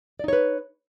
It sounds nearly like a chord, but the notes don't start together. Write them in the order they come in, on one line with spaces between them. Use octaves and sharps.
D5 D#4 C#5 B4